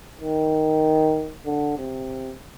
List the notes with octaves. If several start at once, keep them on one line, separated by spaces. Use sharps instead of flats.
D#3
D3
C3